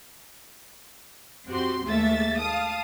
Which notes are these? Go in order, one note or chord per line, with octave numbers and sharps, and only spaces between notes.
F2 C4 F#4 G4 C6
D#2 G#2 A3 A#3 E5 A6
F5 A5 D#6